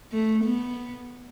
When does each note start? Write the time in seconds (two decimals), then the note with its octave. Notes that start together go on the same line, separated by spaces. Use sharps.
0.12 A3
0.44 B3